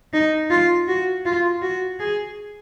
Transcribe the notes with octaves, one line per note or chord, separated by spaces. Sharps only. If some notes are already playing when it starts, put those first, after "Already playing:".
D#4
F4
F#4
F4
F#4
G#4